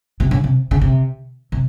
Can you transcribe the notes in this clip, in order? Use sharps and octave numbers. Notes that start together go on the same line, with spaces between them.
C3
C#3
C3
C#3
C3
C3